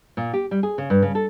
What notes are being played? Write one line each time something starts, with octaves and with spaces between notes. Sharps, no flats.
A#2
G4
G3
G#4
C#3
G2
C#3
A4